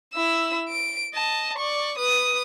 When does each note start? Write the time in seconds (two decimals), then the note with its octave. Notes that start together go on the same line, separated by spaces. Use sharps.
0.14 E4 E6
0.69 D7
1.14 D#5 A5
1.58 D5 C#6
1.98 B4 D#6